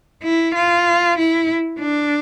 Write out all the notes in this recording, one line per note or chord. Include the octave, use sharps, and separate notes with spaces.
E4
F4
E4
D4